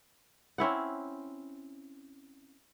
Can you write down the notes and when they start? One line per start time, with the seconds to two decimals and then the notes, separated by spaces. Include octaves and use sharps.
0.58 C4 C#4 E4 F#5